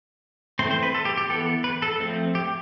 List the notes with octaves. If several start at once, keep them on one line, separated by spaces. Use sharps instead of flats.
E3 A3 C4 C5
C5
B4
A4
G4
G4
E3 B3 A4
B4
A4
F3 A3 C4
G4